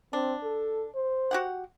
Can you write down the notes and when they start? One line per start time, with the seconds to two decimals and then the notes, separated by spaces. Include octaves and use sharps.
0.13 C4 D4
0.43 A4
0.95 C5
1.31 F#4 G4 F#5